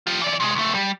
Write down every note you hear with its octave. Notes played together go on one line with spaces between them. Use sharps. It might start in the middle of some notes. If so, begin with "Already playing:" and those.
F4 G4
E3 D5
C3 G#3
C#2 A3
G3